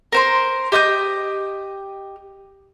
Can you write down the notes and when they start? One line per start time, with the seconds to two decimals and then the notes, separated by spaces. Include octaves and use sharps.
0.12 A#4 C5 C6
0.72 G4 D#5 D#6 G6